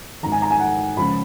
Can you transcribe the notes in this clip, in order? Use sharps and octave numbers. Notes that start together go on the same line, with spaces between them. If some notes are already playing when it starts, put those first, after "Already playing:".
G#2 D#3 A#5
G#5
A#5
G#5
F#5
C#2 C#3 F3 B5